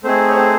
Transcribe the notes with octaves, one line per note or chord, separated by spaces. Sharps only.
A3 C4 D#4 G#4 C5
C#5
C4 C5